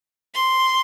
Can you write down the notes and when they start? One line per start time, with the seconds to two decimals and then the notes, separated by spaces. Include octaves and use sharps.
0.34 C6